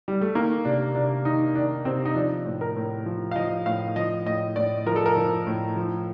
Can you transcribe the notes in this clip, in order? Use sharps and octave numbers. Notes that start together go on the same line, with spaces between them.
G3
A3
D#3 A#3
C3 D4
C3 D4
D#3 D#4
D#3 D4
C3 C4
D#4
F3 D4
A2
A#4
A2
F3
F5
F3 D#5
A2 F5
F3 D#5
A2 D#5
A2 D5
F3 A#4
A4
A#4
F3
A2
F3